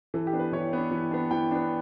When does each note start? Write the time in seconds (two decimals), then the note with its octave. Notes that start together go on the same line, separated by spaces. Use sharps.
0.14 E3 A4
0.27 G4
0.33 B3 D4
0.39 B4
0.52 E3 C#5
0.73 B3 D4
0.91 E3
1.11 B3 D4
1.31 E3 G5
1.51 B3 D4